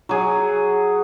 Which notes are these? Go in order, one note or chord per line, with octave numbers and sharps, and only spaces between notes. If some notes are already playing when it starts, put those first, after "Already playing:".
F#3 G#4